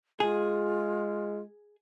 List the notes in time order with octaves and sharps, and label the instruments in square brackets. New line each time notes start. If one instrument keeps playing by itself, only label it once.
[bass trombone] G#3 [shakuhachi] F4 [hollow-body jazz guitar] G#4